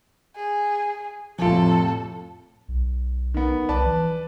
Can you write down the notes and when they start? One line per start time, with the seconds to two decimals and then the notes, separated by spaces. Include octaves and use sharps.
0.36 G#4
1.39 F2 A2 C3 F3 F4 A4
2.68 B1
3.34 D#3 B3
3.69 C2 B4 D5 A5
3.86 E3